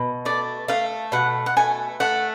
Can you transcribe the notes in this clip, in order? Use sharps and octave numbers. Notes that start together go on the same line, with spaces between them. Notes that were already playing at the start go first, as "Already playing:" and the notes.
Already playing: B2
A3 D5
A3 F5
B2 F#5
F#5
A3 G#5
A3 F#5